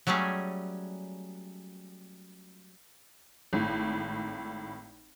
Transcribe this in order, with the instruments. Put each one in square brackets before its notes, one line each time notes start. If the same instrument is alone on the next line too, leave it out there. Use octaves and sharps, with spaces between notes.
[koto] F#3 G3 A3 C#4 G#4
[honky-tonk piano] G#1 A2